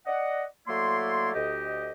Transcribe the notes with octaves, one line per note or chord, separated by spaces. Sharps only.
D5 D#5 F#5
F#3 A3 A#3 E4 D5 C6
D2 G4 D#5